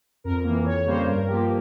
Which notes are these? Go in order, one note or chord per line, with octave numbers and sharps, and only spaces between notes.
F2 A#4
E3 A#3
F2 C#5
C#3 G3 A#3 C5
G2 A#4
F3 A#3 G4